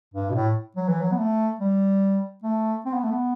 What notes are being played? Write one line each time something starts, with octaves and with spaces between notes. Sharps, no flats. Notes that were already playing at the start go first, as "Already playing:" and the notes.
G2
B2
A2
F#3
E3
F#3
B3
A3
G3
A3
C4
B3
A3
B3